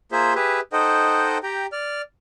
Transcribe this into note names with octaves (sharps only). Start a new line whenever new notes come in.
A#3 F4 G#4 C5 E5
G4 G#4 B4 E5
D#4 A4 C5 D#5 F#5 G5
G4 G5 A#5
D5 F6